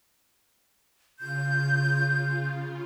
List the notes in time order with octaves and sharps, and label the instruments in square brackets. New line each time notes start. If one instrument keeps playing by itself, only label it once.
[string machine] C#3 F4 [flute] G6